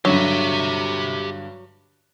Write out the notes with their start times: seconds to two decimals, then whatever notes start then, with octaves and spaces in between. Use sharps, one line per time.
0.05 G2 D3 F#3 G4 E5